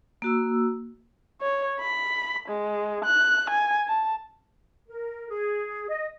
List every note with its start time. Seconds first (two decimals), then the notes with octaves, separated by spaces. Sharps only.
0.22 A#3 F#4 E6
1.41 C#5
1.80 B5
2.48 G#3
3.04 F#6
3.50 G#5
3.88 A5
4.88 A#4
5.30 G#4
5.89 D#5